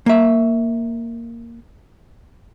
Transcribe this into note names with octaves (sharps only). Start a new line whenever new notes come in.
A#3 E5